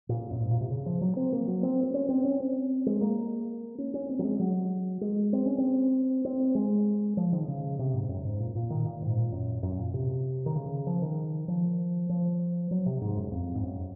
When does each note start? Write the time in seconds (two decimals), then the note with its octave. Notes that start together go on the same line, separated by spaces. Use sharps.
0.09 A#2
0.31 F#2
0.40 G#2
0.51 A#2
0.61 C3
0.71 C#3
0.86 F3
1.01 F#3
1.17 C4
1.33 A#3
1.48 F#3
1.63 C4
1.83 C4
1.94 C#4
2.09 C4
2.24 C#4
2.40 C4
2.86 G#3
3.01 A#3
3.78 C#4
3.94 C#4
4.09 C4
4.19 F#3
4.24 G#3
4.39 F#3
5.01 G#3
5.33 C4
5.46 C#4
5.58 C4
6.25 C4
6.55 G#3
7.17 F3
7.32 D#3
7.48 C#3
7.79 C3
7.94 G#2
8.09 F#2
8.25 G#2
8.40 A#2
8.55 A#2
8.70 D#3
8.86 A#2
9.02 G#2
9.17 A#2
9.32 F#2
9.63 F#2
9.79 A#2
9.94 C3
10.46 D#3
10.56 C#3
10.87 F3
11.02 D#3
11.48 F3
12.09 F3
12.71 F#3
12.86 C3
13.01 G#2
13.17 F#2
13.32 F2
13.55 G#2
13.63 F#2